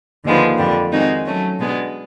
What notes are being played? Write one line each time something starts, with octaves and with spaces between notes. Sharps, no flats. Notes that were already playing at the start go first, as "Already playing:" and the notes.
D#2 D3 F3 G#3 B3
F2 D3 G3
D#3 G#3 C4 D#4 F#4
F#3 A3 C#4
B2 G#3 B3 D4